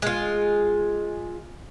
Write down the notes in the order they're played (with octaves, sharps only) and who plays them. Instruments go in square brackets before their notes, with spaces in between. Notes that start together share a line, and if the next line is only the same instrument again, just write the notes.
[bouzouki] G#3 F4